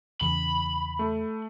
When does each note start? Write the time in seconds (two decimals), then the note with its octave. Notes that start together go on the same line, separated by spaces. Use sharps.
0.21 E2 C#3 E3 B5
0.99 A3